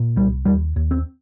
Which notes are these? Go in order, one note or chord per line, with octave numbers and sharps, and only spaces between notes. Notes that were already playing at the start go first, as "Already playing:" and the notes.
Already playing: A#2
C2 G3
D#2 G3
D#2
C4